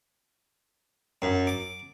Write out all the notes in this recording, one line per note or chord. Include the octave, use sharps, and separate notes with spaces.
F#2
D6